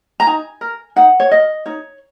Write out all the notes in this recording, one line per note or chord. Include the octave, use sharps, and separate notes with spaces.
A#5
D#4 G#5
A#4
D#4 F#5
C#5
A#4 D#5
D#4 C#5